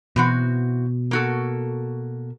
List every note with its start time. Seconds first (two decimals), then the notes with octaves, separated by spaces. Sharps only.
0.16 B2 E3 C4 F#4
1.11 A#3 F#4 A4